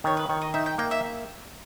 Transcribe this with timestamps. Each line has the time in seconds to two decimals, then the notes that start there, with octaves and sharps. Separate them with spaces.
0.04 D#3 C#5
0.17 B4
0.29 D#3 C#5
0.41 D#5
0.54 D#4 E5
0.66 G5
0.78 A#3 G5
0.91 E5